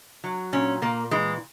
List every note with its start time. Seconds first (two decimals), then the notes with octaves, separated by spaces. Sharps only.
0.24 F#3
0.53 A#2 C#4
0.82 A#2 A#3
1.11 E3 G#3